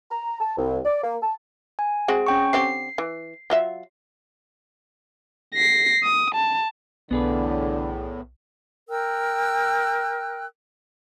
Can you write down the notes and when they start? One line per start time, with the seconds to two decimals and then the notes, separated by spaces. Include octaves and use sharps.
0.10 A#5
0.39 A5
0.57 C2
0.86 D5
1.03 A#3
1.22 A5
1.79 G#5
2.08 G#3 C4 F#4 G#4
2.26 C#4 G5 C#6
2.53 D3 C4 G4 C7
2.98 E3
3.50 F#3 F4 E5
5.55 A#6 C7
6.03 D#6
6.35 A5
7.11 B1 E2 A2 D3 B3 G#4 B4
8.89 A#4 G5 E6 F#6